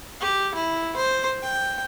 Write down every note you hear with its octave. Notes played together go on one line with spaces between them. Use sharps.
G4
E4
C5
G5